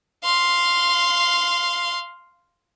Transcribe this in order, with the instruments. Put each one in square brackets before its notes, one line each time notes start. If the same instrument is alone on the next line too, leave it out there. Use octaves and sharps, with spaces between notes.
[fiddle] F5 C6